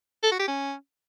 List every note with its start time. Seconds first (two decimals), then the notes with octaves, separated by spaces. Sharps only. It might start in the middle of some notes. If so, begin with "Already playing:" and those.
0.23 A4
0.31 F#4
0.39 G4
0.48 C#4